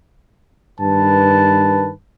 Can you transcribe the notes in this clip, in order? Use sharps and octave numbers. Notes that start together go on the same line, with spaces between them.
G2 D#3 B4 A5